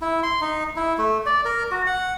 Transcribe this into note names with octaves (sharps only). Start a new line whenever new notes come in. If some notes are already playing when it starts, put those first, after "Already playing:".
E4
C6
D#4
E4
A3
D5
A#4
F#4
F#5